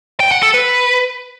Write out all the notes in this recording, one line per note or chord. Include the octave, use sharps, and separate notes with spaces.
G5
F#5
A4
B4